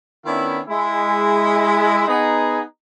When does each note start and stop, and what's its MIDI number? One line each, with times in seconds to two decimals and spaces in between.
0.26 0.59 51
0.26 0.59 59
0.26 0.59 61
0.26 0.59 62
0.26 0.59 64
0.69 2.04 56
0.69 2.04 64
2.07 2.61 59
2.07 2.61 63
2.07 2.61 68